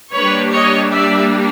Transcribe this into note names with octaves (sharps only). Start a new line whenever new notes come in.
G3 A#3 D4 B4 C#5
C#5 D#5
D5 E5